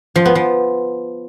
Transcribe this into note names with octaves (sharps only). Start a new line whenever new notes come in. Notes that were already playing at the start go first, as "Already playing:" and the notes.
F3
B3
F3